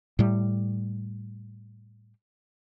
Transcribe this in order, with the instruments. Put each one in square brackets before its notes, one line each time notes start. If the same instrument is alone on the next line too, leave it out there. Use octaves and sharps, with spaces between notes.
[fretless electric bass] A2 G3